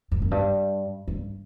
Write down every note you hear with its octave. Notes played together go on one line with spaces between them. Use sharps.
G2
F#2
G2
G2